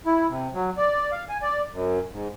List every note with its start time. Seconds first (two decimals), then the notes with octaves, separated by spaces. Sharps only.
0.06 E4
0.29 C3
0.54 F#3
0.77 D5
1.12 F5
1.29 G#5
1.42 D5
1.73 F#2
2.12 G#2